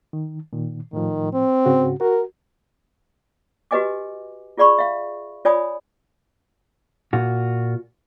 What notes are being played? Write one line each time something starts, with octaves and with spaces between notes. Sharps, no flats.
D#3
A#2 D#3
A2 D#3 F3
C4
G#2 C#3 F#4
F#4 A#4
F#4 G4 B4 D#5 G#5 D6
F4 G#4 D5 B5 C#6
E5 F5
F4 C#5 D5 G#5 B5 D#6
A#2 F4 F#4